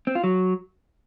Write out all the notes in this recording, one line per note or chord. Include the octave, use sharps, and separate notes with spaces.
C4
F4
F#3